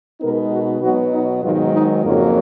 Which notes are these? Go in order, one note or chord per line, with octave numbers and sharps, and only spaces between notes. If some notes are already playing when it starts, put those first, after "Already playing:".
B2 G#3 B3 D#4 A#4
F#4
B2 F#3 B3 D#4 F#4
D#4
G#2 D#3 F#3 F4
D#4
F2 C#3 F#3 A#3 F4